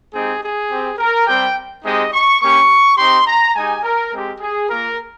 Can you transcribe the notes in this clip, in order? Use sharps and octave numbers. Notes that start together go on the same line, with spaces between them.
G#3 C4 D#4 G4 G#4
G#4
C4 G4
A#4
G3 C4 G4 G5
G#3 C4 D#4 G4 D#5
C#6
A#3 C#4 G4 C#6
C4 D#4 G4 C6
A#5
G#3 D#4 G4 G#5
A#4
G#3 C4 G4
G#4
A#3 F4 A#4